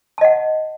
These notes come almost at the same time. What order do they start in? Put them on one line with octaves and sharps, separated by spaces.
A5 D#5 F#5